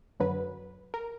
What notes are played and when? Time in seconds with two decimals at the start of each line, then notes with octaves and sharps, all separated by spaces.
0.20 F#2 D3 F#3 B4
0.94 A#4